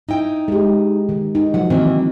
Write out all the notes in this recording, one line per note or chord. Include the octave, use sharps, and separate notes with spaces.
D#4 E4 G5
G#3 G4
D#3
D#4
F3 F#3 F#5
D#3 E3 A#3 C4